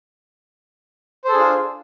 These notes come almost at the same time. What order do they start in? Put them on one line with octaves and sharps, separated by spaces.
C5 A4 G#4 D4 F4